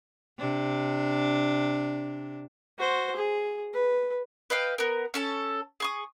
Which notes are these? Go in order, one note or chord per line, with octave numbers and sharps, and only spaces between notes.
C3 D4
F#4 C5
G#4
B4
B4 D#5 F5 G5
B3 A#4
C#4 A4 A5
G#4 C#6 D#6